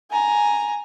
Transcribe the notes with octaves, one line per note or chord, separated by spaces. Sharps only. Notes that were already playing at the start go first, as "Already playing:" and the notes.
G#5 A#5